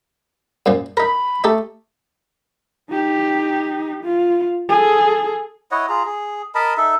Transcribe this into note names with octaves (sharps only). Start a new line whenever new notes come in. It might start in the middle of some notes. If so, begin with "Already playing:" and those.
F#2 A#2 F3
D#4 A#4 B5
A3 D#4 G4 A4
D#4 G4
F4
G#4 A4
E4 C#5 D#5 F#5
F4 G#4 A#5
G#4
A#4 D#5 A5 B5
D#4 A4 E5